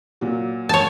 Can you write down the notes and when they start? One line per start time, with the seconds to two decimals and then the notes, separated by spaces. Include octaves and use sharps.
0.21 A#2 F#3
0.69 C#5 A5